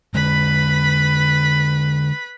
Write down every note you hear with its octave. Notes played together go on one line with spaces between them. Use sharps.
D3 G#3 B4 B5